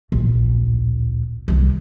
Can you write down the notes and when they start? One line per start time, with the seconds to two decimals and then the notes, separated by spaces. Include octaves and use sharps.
0.12 D1 A#1
1.48 C2 D#3